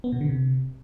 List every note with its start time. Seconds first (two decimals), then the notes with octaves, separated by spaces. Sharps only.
0.04 B3
0.12 B2
0.21 D3
0.29 C3